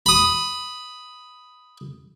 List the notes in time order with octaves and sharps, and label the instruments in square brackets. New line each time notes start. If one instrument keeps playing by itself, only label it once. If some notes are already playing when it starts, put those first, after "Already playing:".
[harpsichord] B5 D#6